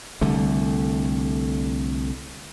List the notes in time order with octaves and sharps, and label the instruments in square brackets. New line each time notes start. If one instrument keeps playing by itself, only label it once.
[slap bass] C2 D3 A3